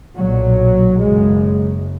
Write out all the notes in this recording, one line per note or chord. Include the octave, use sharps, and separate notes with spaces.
B1 A#2 F#3
F#1 F#2 C#3 G#3